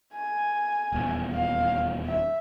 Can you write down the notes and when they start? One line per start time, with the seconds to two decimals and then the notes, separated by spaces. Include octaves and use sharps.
0.15 G#5
0.93 D#1 E2
1.33 F5
2.07 E5